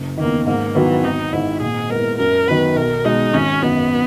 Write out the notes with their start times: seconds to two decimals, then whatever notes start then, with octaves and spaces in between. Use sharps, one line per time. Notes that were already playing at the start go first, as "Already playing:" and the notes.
Already playing: F#1
0.18 E2 D#3 A#3
0.47 G#2 A#3
0.75 D#3 E3 F#3 B3
1.04 G#1 D#4
1.33 G#2 D#3 E4
1.61 A#2 G#4
1.89 G#3 B3 E4 A#4
2.18 F#2 A#4
2.47 D#3 F#3 B3 B4
2.75 B1 A#4
3.04 B2 G#3 D#4
3.33 G#1 C#4
3.62 F#2 D#3 B3